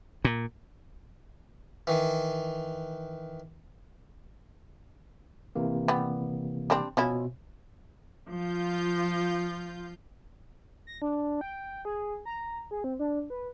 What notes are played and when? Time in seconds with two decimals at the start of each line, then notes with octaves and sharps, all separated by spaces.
0.25 A#2
1.87 D#3 E3
5.56 C3 E3 A#3
5.88 G3 B3
6.70 G3 C4 D4
6.97 B2 F3 C#4 E4
8.28 F3 F4 G6
10.87 A#6
11.02 D4
11.41 G5
11.85 G#4
12.25 A#5
12.71 G#4
12.84 C4
12.99 D4
13.30 B4